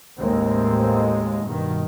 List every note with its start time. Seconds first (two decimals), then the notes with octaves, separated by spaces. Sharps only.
0.19 A1 D#2 A2 G#3 A#3 C4
1.46 G2 B2 D#3